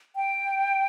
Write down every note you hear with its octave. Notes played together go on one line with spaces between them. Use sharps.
G5